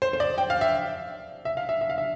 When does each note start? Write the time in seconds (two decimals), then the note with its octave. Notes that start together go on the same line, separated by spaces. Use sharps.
0.02 C5
0.13 C5
0.20 D5
0.38 G5
0.50 F5
0.61 E5
1.45 E5
1.57 F5
1.69 E5
1.81 E5
1.90 F5
1.98 E5